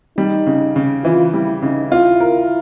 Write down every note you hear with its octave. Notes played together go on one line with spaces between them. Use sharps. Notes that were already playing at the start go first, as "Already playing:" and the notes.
G3 D#4
C#3
C#3
E3 F4
G3 E4
C#3 D#4
E4 F4
A#4